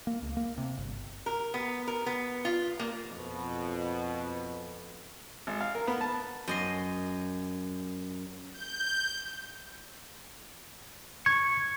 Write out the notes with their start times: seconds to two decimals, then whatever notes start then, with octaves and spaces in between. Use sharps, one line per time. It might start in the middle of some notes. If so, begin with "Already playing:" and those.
0.07 A#3
0.22 C#2
0.37 A#3
0.58 C3
0.77 G1
1.26 A#4
1.54 B3
1.87 A#4
2.06 B3
2.45 F4
2.80 A#3
3.10 F2 B2
5.47 G#1
5.60 F5
5.75 A#4
5.87 B3
6.01 A5
6.48 F#2 D#5 C6
8.52 G6
11.26 C#6 G#6